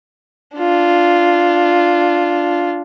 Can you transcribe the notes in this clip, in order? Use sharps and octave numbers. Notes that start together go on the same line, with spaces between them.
D4 F4